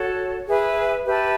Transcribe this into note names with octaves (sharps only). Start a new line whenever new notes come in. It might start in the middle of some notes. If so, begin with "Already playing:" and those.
Already playing: F#4 A4 C#5
G#4 B4 E5
G4 B4 E5 A5